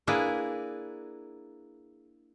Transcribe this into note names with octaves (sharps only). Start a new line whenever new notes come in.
A#3 D4 E4 G#4 B4